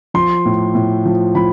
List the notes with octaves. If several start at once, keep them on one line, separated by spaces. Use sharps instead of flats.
F3 C6
A2
A2
F3
F3 B5